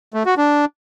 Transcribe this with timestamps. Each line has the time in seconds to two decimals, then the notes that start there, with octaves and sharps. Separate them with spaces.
0.14 A3
0.26 F#4
0.37 D4